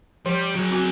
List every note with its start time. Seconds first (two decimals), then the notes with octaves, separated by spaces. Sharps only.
0.26 F3 G3
0.55 F#3 G#4
0.71 C4 F#4